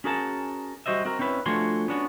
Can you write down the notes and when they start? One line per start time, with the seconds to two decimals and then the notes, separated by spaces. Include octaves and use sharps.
0.04 C#4 F#4 G#4 A#4 F#5 A5
0.86 G3 F#4 C5 D#5 E5
1.05 C4 F#4 A#4
1.19 C4 C#4 E4 B4
1.46 F3 A3 D4 F#4 G#5 C6
1.88 B3 C#4 D4 F#4